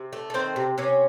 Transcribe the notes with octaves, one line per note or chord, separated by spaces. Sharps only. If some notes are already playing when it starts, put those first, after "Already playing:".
Already playing: C3
A3
A4
D#3 C4 C5
C3
C3 C#4 C#5